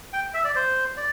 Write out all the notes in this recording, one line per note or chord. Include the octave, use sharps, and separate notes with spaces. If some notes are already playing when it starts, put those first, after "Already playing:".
G5
E5
D5
C5
D5